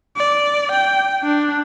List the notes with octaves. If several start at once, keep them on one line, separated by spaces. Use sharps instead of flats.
D5
G5
D4